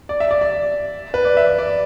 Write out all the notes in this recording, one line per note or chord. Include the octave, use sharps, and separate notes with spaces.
D5
E5
D5
D5
B4
D5
E5
D5